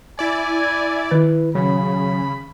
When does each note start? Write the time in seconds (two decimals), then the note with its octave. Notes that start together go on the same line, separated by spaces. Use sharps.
0.19 E4 D5 G#5
1.11 D#3 E4 B4
1.55 C#3 F#3 B5